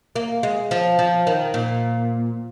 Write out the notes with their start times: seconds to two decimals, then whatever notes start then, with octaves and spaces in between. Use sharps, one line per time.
0.16 A#3
0.43 G#3
0.71 F3
0.99 F3
1.27 D#3
1.54 A#2